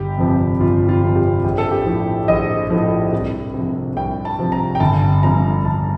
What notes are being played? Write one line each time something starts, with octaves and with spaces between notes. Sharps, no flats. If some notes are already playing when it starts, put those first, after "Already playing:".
Already playing: G1 G4
F2 C3 F3
G1 F4
F4
F2 C3 F3
G4
A#1 G4
A4
G4
A2 F3
A#1 D#5
A2 F3
C2
C3 F3
C2 G5
A5
C3 F3
A#5
G5
G1 A5
G2 F3 A#5
G1 A5